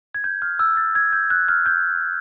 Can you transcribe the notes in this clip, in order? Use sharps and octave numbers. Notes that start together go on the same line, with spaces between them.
G#6
G6
F6
E6
A6
G#6
G6
F#6
F6
G6